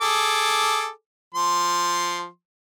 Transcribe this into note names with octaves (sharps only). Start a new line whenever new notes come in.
G#4 A4 D6
F3 C6